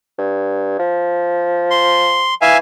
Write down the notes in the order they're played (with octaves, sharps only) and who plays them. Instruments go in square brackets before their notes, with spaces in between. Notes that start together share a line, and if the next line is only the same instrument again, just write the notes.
[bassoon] G2
F3
[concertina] C6
[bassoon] E3 [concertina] E5 F5 G#5